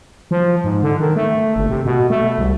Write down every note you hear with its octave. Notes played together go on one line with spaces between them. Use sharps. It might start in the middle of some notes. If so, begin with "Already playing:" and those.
F3
G#2
D3
D#3
A3
G1
C3
B2
A3
C2